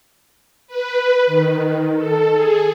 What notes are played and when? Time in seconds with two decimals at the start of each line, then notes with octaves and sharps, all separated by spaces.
0.68 B4
1.27 D#3
1.95 A4
2.33 G#4